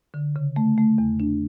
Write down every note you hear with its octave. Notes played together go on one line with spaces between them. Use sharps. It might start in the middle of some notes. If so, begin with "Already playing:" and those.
D3
C#3
A3
A3
E2
D4